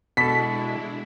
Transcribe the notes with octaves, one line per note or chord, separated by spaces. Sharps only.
B2 G#3 D4 E4 A4 B6